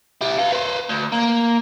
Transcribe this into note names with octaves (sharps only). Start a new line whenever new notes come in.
E4 G4
B4 F5
B4 C5
D2
A#3